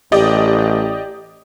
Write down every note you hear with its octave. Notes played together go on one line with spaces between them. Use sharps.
A1 G4 D5 D#5